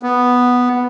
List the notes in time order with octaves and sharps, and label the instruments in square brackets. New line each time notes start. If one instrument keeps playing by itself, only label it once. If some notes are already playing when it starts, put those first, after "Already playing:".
[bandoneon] B3